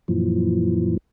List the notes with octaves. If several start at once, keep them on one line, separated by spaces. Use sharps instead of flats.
F#2 A#2 E3 F3